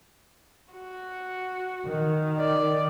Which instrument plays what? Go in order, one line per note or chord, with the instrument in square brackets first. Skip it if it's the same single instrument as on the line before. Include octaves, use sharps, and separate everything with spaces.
[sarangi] F#4
[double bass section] D#3
[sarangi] D5